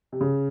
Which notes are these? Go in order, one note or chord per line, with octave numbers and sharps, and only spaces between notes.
C3
C#3